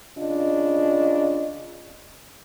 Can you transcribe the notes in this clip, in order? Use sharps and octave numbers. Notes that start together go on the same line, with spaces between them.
C#3 D4 F4 D#5